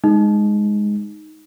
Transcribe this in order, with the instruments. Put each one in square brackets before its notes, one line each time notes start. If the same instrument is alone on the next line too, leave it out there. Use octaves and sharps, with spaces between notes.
[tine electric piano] G#3 [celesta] D#4